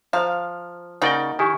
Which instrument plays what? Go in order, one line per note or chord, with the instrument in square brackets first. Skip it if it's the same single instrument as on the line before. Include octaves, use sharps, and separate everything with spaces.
[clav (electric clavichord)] F3 [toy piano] C5 A#5 [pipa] F5
[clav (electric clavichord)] C#3 D5 G5 [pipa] A#3 D#4 F#4
[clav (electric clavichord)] D#3 E4 [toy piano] G4 G#5